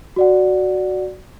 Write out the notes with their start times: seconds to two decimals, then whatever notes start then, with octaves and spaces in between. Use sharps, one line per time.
0.16 F#4 D5 F#5